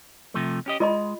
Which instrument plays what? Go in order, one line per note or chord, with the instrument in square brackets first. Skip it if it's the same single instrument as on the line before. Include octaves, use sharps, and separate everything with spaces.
[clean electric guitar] C3 F3 A3
C#4 G4 D#5
[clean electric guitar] G#3 [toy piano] F4 D#5 B5